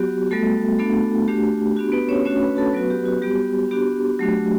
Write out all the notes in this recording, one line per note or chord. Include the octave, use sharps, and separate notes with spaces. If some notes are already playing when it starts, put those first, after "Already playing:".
Already playing: F#3 B3 F#4 G4
G3 A3 B3 F#4 A4
A3 B3 D4 F#4 A4
A3 D4 F#4 G4
B3 D4 F#4 G4
B3 B4
C#4 C#5
A3 C#4 D4 F#4 C#5
B4 B5
A4 A5
F#3 B3 F#4 B4
G4
F#4
G3 B3 F#4 G4
B3 D4 F#4 G4
F#3 A3 D4 F#4